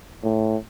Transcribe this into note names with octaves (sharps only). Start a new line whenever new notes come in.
A2